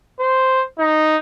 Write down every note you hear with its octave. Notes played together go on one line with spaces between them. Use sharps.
C5
D#4